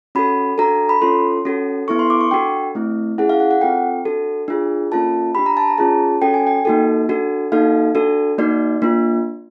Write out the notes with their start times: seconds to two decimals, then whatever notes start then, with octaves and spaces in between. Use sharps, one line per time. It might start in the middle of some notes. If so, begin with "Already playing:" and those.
0.15 C#4 F#4 A4 B5
0.58 D4 F#4 A4 A#5
0.89 B5
1.01 C#4 F4 A4 C6
1.45 C#4 F#4 A4
1.88 B3 E4 A4 C#6
1.99 C6
2.10 D6
2.21 C#6
2.31 D4 F#4 A4 G5
2.75 A3 C4 E4
3.18 C#4 E4 G#4 F#5
3.29 F5
3.40 F#5
3.51 F#5
3.61 C4 F4 A4 G5
4.05 D4 F#4 A4
4.48 D4 F4 G#4
4.92 A#3 C#4 F4 A4 A5
5.35 D4 G4 B5
5.46 A#5
5.57 A5
5.67 A#5
5.78 C#4 F4 G#4 A5
6.22 C#4 F#4 A4 G5
6.34 G#5
6.47 G5
6.65 A#3 D#4 F#4 A4
7.09 D4 F#4 A4
7.52 A#3 D#4 F#4 A4 F5
7.95 D4 F#4 A4
8.38 A#3 D#4 F#4 D5
8.82 A#3 D4 F4